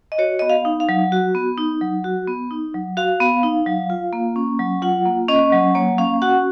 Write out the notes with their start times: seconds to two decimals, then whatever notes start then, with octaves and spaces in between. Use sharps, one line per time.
0.12 D#5
0.18 F#4 C#5
0.39 B3 D#5
0.50 F5
0.65 D#4
0.80 F5
0.89 F#3
1.12 F#4
1.35 B3
1.58 D#4
1.81 F#3
2.04 F#4
2.27 B3
2.51 D#4
2.74 F#3
2.97 F#4 F5
3.20 B3
3.43 D#4
3.66 F#3
3.90 F4
4.13 A#3
4.36 C#4
4.59 F#3
4.82 F4 F#5
5.06 A#3
5.29 C#4 D#5
5.52 F#3
5.75 A#3 C#5
5.98 C#4 F5
6.22 F#4 F#5